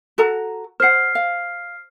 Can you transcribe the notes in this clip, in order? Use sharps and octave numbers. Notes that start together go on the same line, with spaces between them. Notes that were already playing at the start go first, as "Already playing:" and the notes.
F#4 A4 A#5
C5 F#5 F6 C7
F5